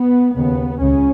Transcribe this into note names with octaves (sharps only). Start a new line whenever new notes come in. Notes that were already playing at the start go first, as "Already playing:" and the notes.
Already playing: B3
D#2 C#3 B3
C#2 C#3 C#4